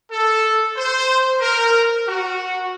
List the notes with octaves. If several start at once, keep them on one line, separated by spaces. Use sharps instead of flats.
A4
C5
A#4
F#4